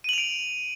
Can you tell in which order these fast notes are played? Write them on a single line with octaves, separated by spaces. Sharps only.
D#7 F#7 F7 D7